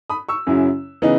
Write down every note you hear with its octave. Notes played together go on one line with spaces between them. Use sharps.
B5 D#6
C#6 E6
F#2 C#3 F#3 C#4 E4
C#3 E3 B3 D#4